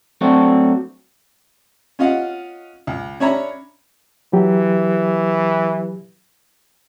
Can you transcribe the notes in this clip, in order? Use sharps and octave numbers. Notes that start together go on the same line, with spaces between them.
F#3 A3 C4 D4 F#4
C#4 F4 D#5 F5 F#5
C#2
C#4 D4 C#5 E5 A#5 B5
E3 F#3 G4